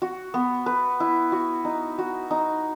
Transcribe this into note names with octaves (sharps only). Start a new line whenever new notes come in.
F#4
B3
B4
E4
F#4
D#4
F#4
D#4